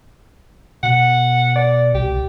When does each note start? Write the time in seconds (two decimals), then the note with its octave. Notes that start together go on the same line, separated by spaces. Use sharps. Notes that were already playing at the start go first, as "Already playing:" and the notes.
0.83 B2 F#5
1.55 D5
1.94 C2 G4